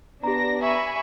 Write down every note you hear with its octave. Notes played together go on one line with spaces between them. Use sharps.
B3 D4 G4 A#5 A#6
E5 G#5 B5 C#6